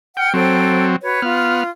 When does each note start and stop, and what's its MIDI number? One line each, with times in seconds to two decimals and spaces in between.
0.17 0.33 78
0.17 0.33 79
0.17 0.33 89
0.34 0.96 54
0.34 0.96 60
0.34 0.86 69
0.34 0.86 72
0.34 0.86 79
1.01 1.20 66
1.01 1.20 71
1.01 1.20 73
1.22 1.63 59
1.22 1.68 65
1.22 1.63 89